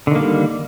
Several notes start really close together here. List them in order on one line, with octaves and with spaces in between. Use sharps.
D3 D#3 A#3 G3